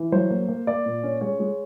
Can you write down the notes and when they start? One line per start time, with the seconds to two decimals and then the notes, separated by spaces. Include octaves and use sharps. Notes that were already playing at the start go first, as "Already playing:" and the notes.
Already playing: E3
0.12 F#3 C5
0.30 A#3
0.48 A#3
0.67 A#3 D5
0.86 A#2
1.03 C#4
1.21 G#3 C#5
1.40 G#3